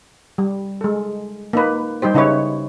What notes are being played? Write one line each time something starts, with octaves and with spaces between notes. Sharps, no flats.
G3
G#3 A4
A#3 D#4 B4
G3 D#4 G4 C5
C#3 D#4 E4 B4 C#5